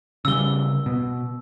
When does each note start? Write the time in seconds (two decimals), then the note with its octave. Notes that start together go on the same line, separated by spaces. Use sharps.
0.25 C#3 G3 E6 G7
0.86 B2